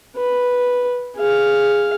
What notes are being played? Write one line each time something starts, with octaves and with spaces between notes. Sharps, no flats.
B4
G#4 F5